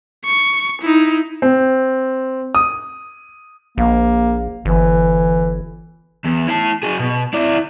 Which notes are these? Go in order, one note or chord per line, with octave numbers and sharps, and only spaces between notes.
C#6
D#4 E4
C4
D#6
A#1 A#3
G1 E3
E2
E4 A5
F#3 G#4
B2
E4 D5